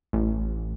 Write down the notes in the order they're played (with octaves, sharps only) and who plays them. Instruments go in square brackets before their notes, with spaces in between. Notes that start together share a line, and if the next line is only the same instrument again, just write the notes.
[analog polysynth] A1